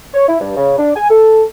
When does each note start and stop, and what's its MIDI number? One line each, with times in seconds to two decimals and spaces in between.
0.14 0.28 73
0.29 0.38 64
0.40 0.53 43
0.57 0.76 49
0.78 0.91 62
0.96 1.09 80
1.10 1.44 69